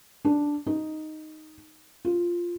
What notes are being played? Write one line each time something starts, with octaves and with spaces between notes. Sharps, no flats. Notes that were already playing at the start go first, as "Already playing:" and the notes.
D4
D#4
F4